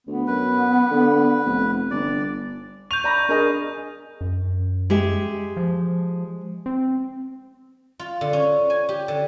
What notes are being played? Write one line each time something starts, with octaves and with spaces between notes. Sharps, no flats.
D2 B3
F#2 B4
D3
F1
G1 D5
C#6 G6 F7
D5 A#5 B5
D4 G#4 A#4 D#5
F#2
G#3 G4 E5
F3
C4
F4
D3
C#4
G#5
G4
D3